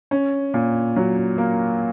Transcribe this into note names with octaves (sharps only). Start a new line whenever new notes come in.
C#4
A#2
F#3
A#3